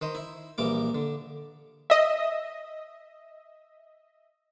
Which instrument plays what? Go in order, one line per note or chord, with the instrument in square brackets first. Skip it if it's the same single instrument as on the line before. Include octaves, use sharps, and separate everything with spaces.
[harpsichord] D#3 C5 D#5
E4
A#1 E3 G3 A#3 D6
D3
[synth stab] D#5 E5